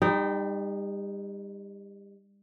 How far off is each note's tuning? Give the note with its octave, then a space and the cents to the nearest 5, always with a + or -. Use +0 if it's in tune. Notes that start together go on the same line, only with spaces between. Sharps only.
G3 +30 D#4 -10 G5 -10